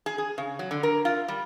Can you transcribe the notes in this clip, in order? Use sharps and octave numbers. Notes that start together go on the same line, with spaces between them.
G#4
G#4
C#3
F#3
D3
A#4
F4
G3